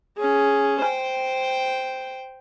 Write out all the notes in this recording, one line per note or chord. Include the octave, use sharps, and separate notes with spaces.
C#4 G#4
C5 G5